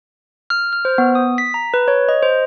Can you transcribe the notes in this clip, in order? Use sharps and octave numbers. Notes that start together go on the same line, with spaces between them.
F6
F6
C5
B3
D#6
B6
A#5
B4
C#5
D#5
C5